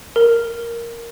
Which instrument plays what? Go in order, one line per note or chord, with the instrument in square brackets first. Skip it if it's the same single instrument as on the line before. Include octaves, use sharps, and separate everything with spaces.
[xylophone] A#4